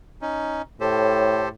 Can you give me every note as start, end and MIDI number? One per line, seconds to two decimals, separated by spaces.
0.22 0.62 61
0.22 0.62 63
0.81 1.53 45
0.81 1.49 67
0.81 1.49 69
0.81 1.49 72
0.81 1.42 73